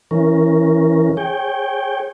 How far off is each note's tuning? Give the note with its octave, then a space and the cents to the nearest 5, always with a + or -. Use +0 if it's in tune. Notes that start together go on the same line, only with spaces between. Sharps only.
E3 +0 C#4 +0 A#4 +0
G#4 -10 C#5 -25 G5 +0